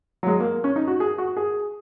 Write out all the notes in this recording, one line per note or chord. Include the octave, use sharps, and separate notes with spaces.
F#3
G#3
A#3
C#4
D#4
F#4
G#4
F#4
G#4